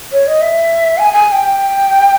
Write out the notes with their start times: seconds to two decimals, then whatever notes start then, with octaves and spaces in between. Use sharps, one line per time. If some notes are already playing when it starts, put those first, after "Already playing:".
0.13 C#5
0.27 D#5
0.42 E5
0.98 G#5
1.13 G#5
1.27 G#5
1.32 G5